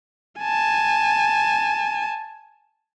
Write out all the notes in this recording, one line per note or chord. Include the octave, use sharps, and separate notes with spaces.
G#5 A5